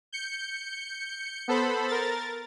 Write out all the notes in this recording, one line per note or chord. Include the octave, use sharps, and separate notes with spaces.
G6 C#7
B3 A4 C5 B5
A#4 A6